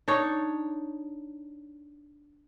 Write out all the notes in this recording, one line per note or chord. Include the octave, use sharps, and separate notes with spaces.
D4 D#4 C#5